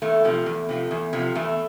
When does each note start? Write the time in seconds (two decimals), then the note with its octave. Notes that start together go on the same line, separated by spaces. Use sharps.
0.02 E2 A3
0.24 C3 F3
0.46 E2
0.69 C3 F3
0.91 E2
1.13 C3 F3
1.35 E2 A3